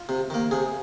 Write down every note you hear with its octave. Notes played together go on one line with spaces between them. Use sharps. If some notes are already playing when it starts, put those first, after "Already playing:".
Already playing: F4
C3
D#3 A#3
C3 G#4